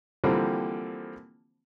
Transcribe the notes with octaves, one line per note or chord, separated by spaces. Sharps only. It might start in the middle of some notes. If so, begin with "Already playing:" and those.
D3 E3 F3 G3 A#3 C4